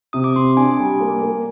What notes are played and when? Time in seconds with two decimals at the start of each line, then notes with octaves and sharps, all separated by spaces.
0.13 C3 D#6
0.24 D6
0.36 C3 C6
0.57 D4 G#5
0.80 G3
1.00 A#3
1.22 A#3